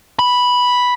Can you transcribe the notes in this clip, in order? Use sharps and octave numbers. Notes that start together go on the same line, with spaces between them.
B5